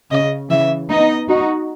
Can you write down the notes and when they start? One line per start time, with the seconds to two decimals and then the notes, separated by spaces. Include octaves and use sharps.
0.11 C#3 D#5
0.50 C#3 E3 E5
0.90 B3 D#4 D#5
1.29 D#4 F#4